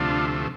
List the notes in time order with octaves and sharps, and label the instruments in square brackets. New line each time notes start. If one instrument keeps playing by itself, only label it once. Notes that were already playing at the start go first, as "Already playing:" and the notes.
Already playing: [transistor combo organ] D2 C3 F3 A3 D4 F4